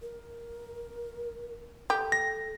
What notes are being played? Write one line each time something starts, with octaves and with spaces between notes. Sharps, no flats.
A#4
G4 A4
A#6